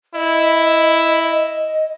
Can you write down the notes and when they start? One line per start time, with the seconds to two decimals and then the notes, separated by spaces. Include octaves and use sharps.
0.14 E4 D#5